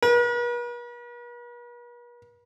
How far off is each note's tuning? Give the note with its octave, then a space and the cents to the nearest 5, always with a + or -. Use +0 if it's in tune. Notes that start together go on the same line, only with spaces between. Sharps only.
B4 -45